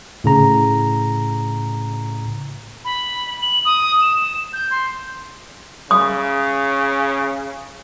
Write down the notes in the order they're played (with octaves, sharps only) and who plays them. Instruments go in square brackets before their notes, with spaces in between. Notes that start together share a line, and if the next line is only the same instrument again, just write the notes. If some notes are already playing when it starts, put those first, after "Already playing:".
[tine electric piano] A2 C#3 A#5
[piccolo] B5
F#7
D#6
E7
G6
C6
[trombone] C#3 [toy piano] D#6